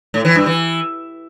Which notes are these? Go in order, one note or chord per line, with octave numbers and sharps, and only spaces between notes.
A2
E3
G2
E3